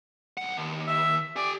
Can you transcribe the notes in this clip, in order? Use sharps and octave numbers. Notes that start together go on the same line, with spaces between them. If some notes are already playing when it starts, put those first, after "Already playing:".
B1 F#5
D#2
E5
G4 D5 G#5